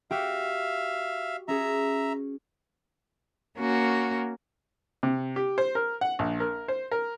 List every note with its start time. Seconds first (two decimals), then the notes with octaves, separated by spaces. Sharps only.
0.11 F#4 G4 E5 F5 G5
1.48 C#4 G#4 E5 A#5
3.58 A#3 C#4 F#4
5.03 C3
5.36 G4
5.58 C5
5.75 A#4
6.01 F#5
6.19 A#1
6.40 A#4
6.68 C5
6.91 A#4